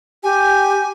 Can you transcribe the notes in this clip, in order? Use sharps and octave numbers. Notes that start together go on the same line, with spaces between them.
G4 G#5